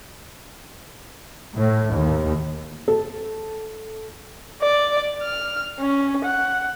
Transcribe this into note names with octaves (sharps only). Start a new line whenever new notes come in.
A2
D#2
A4
D5
F6
C#4
F#5